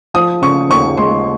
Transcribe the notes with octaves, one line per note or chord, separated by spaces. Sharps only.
F3 D#6
C#3 C#6
D#2 C#6
G#3 C6